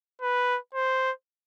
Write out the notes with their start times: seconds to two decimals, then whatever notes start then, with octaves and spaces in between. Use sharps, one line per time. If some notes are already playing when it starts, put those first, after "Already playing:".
0.21 B4
0.75 C5